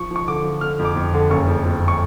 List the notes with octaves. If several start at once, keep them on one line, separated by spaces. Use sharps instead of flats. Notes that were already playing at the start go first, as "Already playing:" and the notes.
Already playing: F3 C#6
F3 C#6
D3 D6
F3
D3 F6
F2
D6
F2
D3
F#1 C#6
F2
F2
C#6